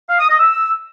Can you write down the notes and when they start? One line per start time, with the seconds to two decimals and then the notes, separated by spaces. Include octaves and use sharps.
0.09 F5
0.19 D#6
0.29 D#5
0.39 E6